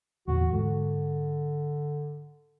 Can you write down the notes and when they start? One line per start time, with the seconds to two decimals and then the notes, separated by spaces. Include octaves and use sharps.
0.28 E2 A#2 D3 F#4
0.52 G#2 D3